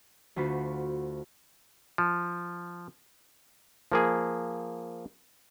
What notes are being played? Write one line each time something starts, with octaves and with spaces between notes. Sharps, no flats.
D2 F4 F#4 B4 C5
F3
F3 A#3 G#4